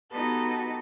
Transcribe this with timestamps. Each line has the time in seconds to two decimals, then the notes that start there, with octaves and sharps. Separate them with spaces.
0.11 B3 D#4 F#4 G4 A4 B4